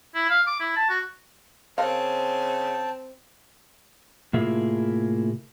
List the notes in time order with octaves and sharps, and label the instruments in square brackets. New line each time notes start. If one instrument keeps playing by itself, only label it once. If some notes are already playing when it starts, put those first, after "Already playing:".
[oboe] E4
F5
D6
E4
A5
F#4
[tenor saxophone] C#3 [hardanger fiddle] C4 [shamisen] A#4 F5 [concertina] G5 A5
[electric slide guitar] A2 C3 A#3 E4 F4 G#4